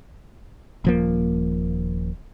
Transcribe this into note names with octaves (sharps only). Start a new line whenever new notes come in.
D#1 F3 A#3